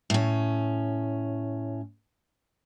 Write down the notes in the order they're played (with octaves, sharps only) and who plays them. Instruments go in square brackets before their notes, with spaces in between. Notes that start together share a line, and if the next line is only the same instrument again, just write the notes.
[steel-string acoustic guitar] A2 C#4